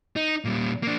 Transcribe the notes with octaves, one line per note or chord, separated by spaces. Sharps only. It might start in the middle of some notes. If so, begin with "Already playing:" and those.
D#4
A#2 G3
A#3 D4